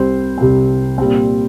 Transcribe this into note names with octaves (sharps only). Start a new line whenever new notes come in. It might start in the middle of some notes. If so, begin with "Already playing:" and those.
Already playing: C2 C3 G3 C4 C5
C2 C3 G3 C4
A#2 G3 C4